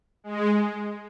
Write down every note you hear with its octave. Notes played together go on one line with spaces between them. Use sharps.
G#3